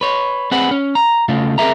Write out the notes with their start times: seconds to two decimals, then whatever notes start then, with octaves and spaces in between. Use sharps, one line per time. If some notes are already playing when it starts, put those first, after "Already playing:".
0.01 B4 C#5
0.51 C4 G#4 B4 F#5
0.71 C#4
0.95 A#5
1.29 C#3 A3 F4
1.58 C4 G#4 A#4 E5 A#5